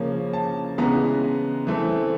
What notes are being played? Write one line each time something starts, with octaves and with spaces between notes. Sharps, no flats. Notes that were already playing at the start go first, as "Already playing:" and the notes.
Already playing: C#3 F3 A#3 C#4
A5
C#3 E3 G#3 B3 A#5
E3 A3 C4